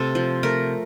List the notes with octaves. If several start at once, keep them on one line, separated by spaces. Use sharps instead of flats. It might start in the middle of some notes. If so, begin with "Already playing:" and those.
Already playing: C3 A3 F4 A4
F3
A3 A#4